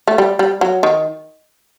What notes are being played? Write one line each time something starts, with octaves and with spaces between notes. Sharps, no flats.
A3
G3
G3
F#3
D#3